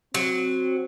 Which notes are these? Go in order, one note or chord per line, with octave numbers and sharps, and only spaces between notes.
F#3 C4